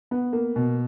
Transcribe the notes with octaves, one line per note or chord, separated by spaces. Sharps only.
B3
A#3
B2